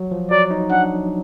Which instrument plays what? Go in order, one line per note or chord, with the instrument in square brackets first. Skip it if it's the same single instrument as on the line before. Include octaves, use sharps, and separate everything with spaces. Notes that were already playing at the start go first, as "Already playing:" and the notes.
Already playing: [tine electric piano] F#3
F3
[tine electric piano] F#3 [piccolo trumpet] D5
[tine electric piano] D#4
[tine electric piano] D4 [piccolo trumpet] F#5